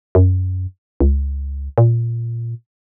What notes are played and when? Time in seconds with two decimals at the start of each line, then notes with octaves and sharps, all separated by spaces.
0.15 F#2
1.00 C#2
1.78 A#2